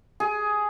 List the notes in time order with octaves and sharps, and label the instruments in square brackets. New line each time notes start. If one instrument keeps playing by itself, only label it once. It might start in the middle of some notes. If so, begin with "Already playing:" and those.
[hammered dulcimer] G#4